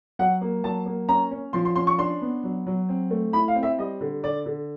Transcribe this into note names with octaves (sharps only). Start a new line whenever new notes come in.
F#3 F#5
A#3
F#3 A5
A#3
C#4 A#5
C#4
F3 C6
C6
C#4 C6
C#6
D4 C6
B3
F#3
F#3
C4
A3
E4 B5
F5
C4
E5
G3 D#5
D3
D3 D5
D3